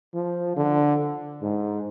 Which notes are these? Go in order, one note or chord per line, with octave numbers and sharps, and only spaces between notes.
F3
D3
G#2